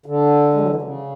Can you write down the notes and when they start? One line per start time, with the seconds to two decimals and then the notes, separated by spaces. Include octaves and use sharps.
0.06 D3
0.54 G#3
0.61 F#3
0.69 E3
0.75 D3
0.82 C#3